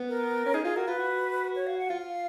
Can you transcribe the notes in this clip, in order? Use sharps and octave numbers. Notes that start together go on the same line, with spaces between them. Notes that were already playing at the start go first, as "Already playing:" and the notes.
Already playing: B3
A#4
C#4
D#4 G#4
F4 G#4
F#4 A#4
F4 B4
F#4
C#5
F5
F#5
F4 F5